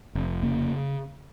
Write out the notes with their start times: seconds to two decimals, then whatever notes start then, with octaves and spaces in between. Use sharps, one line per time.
0.15 F1
0.43 C#3 A#3